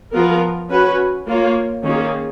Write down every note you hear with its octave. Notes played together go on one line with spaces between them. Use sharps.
F3 B3 F4 A#4
C#4 F#4 B4
A#3 F4 A#4 C#5
D#3 A#3 C#4 F4 G#4